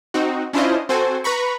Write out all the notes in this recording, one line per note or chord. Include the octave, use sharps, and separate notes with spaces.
C4 D#4 F#4
C#4 D4 E4 F4 C5 D#5
C4 F#4 A4 C5 G#5
B4 A#5 B5 C#6